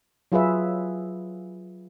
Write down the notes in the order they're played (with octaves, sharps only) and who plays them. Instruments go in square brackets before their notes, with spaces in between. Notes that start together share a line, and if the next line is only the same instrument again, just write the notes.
[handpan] F#3 F4 G#4 B4 E5